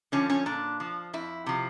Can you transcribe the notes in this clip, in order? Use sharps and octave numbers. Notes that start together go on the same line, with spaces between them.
D3 F3 C#4
C#4
A#2 D4
F3
F2 E4
C3 F3